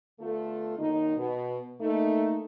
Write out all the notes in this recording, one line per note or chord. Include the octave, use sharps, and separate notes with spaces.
D3 A3 B3 F4 A4
F#2 D#3 A#3 D#4
B2
A3 A#3 D#4